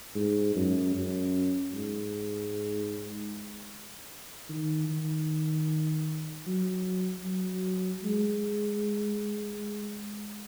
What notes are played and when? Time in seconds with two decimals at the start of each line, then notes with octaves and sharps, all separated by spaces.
0.15 G#2
0.55 F#2
0.94 F#2
1.74 G#2
4.49 D#3
4.89 D#3
6.47 F#3
7.25 F#3
8.04 G#3